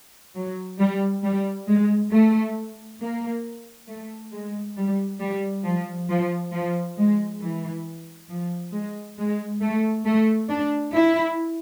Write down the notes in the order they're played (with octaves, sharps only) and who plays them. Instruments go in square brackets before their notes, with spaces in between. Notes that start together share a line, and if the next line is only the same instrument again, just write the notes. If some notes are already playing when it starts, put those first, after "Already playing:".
[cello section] F#3
G3
G3
G#3
A3
A#3
A3
G#3
G3
G3
F3
F3
F3
G#3
E3
F3
G#3
G#3
A3
A3
D4
E4